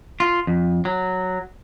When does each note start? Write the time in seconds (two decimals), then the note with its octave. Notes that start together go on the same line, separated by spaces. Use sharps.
0.20 F4
0.47 F2
0.85 F#3